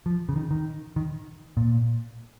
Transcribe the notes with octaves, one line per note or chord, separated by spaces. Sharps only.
F3
C#3
D#3
D#3
D#3
A#2